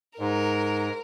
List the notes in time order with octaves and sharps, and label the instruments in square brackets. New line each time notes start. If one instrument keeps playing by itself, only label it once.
[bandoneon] G#2 [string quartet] A#4